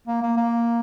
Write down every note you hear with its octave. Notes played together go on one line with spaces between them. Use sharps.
A#3
A#3
A#3